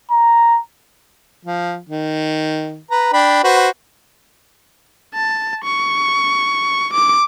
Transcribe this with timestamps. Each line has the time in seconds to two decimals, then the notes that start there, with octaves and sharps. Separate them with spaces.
0.11 A#5
1.45 F3
1.89 D#3
2.91 B4 A#5
3.13 D4 G5 B5
3.44 F#4 B4 C5
5.14 A5
5.64 C#6
6.93 D6